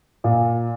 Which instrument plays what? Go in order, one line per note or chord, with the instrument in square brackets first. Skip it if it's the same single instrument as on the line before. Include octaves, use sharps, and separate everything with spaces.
[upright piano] A#2